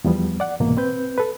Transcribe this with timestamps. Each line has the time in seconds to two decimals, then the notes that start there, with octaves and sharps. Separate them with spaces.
0.04 E2 F3 G3 B3
0.40 D5 F#5
0.60 C2 G#2 B2 E3 A#3
0.77 C4 B4 G6
1.18 A4 B4